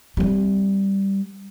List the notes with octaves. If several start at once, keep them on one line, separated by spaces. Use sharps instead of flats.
G3 C4